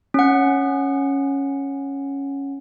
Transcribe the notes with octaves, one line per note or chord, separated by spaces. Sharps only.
C#4 F#5